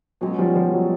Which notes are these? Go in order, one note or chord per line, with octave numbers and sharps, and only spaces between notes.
B2 F#3 G#3 C#4
F3 G3
F3 G3
F#3